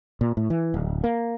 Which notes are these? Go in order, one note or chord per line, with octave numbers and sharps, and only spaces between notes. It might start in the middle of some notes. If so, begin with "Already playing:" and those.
A#2
A2
E3
D1
A#3